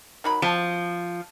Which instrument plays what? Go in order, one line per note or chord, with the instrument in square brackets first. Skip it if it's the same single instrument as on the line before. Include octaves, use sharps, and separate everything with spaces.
[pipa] D#3 F#3 B5
[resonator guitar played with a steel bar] F3 [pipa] F#3 C4